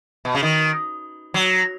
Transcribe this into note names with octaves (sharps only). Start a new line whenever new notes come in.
B2
C#3
D#3
F#3